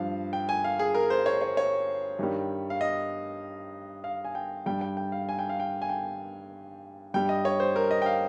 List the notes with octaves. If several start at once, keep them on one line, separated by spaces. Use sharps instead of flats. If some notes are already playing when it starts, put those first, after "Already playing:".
Already playing: G2 F3 F5
G5
G#5
F5
G#4
A#4
C5
C#5
C#5
C#5
G2 D#3 G3
F5
D#5
F5
G#5
G5
G2 G3 G5
G5
G5
F5
G#5
G5
F5
G5
G#5
G5
G2 G3 G5
D#5
C#5
C5
A#4
D#5
G5
F5